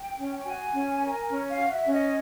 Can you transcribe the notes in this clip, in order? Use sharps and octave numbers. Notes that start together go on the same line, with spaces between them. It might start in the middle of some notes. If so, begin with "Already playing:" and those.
Already playing: G5
C#4
F#4 G#5
C#4
A#4
C#4
F5
F#4
E5
C#4
D#5